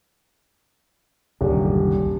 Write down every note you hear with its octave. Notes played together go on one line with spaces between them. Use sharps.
D#1 C2 F#2 D3